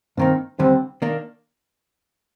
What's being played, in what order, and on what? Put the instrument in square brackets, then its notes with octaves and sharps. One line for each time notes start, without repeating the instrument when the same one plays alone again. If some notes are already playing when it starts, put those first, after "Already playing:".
[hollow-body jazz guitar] G2 D#3 A#3 D#4 [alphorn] C4
[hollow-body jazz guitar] D#2 D3 G3 [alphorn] C4
[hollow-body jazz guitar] D#3 A#3 D4